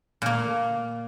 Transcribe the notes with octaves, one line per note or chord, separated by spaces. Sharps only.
A#2 A#3